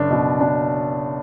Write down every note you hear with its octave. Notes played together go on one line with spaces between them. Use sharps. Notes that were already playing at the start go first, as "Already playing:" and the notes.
Already playing: F#1 D4
B2
D4